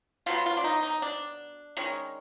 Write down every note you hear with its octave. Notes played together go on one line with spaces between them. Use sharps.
B2 F#3 B3 F4
F4
D4
D#4
D#4
D4
D#3 G#3 C#4